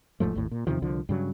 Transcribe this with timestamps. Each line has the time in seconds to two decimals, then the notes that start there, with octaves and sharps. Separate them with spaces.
0.20 E1 G#2 F3 A3
0.35 G#1 D#2 A2
0.51 A#2
0.67 E2 C3 D#3 F3
0.82 C2 D3 F3
1.09 G2 C#3 F#3